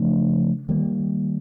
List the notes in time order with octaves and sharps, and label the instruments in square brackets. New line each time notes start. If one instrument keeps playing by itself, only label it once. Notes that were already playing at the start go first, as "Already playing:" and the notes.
Already playing: [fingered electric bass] C#3 F3 A3 D4
D#3 G3 A#3